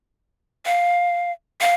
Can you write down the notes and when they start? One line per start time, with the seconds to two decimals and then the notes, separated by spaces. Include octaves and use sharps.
0.65 F5
1.61 F5